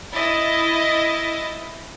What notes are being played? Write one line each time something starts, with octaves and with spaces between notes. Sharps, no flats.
E4 D#5 A6